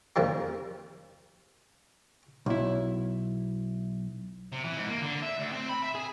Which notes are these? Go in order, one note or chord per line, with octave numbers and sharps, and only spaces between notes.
F2 D#3 F3 G3 A#3
B1 E4
C3
E3
G#2
A#3
D3
E5
D2
C4
B5
E5
G#4